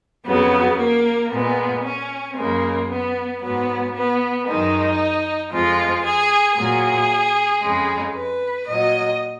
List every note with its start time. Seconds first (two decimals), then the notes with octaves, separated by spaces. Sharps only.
0.24 F2 C#3 F#3 B3
0.77 A#3
1.30 A#2 G#3 B3
1.82 C#4
2.35 F#2 C#3 G#3 A#3
2.88 B3
3.40 G#2 F#3 B3
3.93 B3
4.46 F#2 D#3 G#3 D#4
5.50 F2 F3 G#3 F4
6.04 G#4
6.56 A#2 F#3 G#4
7.62 F2 C#3 G#3
8.14 B4
8.66 A#2 F#3 D#5